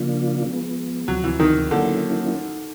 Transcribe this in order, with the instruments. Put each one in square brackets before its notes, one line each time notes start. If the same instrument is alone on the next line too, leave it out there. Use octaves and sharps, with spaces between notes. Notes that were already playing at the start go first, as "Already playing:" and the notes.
Already playing: [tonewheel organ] C#3 F3 A#3 D4 F4
F3 G#3 B3
[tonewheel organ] D2 C3 F3 [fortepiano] F#3
[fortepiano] E3
D#3
[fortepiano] D3 [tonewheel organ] F#3 A#3 C#4 E4